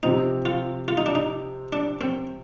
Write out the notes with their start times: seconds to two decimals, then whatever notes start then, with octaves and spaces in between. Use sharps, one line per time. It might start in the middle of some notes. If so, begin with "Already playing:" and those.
0.03 C3 F3 C4 D#4
0.45 F4
0.88 F4
0.97 D#4
1.06 D4
1.15 D#4
1.73 D4
2.01 C4